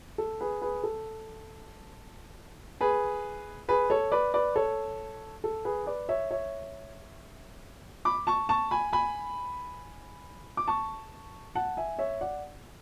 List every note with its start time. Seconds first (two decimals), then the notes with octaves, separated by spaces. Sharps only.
0.18 A4
0.41 G#4 B4
0.62 G#4 B4
0.83 A4
2.81 G#4 B4
3.68 G#4 B4
3.90 A4 C#5
4.12 B4 D5
4.34 B4 D5
4.56 A4 C#5
5.44 A4
5.65 G#4 B4
5.86 B4 D5
6.09 C#5 E5
6.31 C#5 E5
8.05 B5 D6
8.27 A5 C#6
8.49 A5 C#6
8.71 G#5 B5
8.93 G#5 B5
10.57 D6
10.68 A5 C#6
11.55 F#5 A5
11.77 E5 G#5
11.99 C#5 E5
12.21 D5 F#5